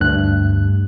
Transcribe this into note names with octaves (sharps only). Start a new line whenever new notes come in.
D2 G2 F#6